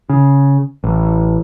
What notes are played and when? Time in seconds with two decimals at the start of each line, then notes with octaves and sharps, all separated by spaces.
0.10 C#3
0.84 A1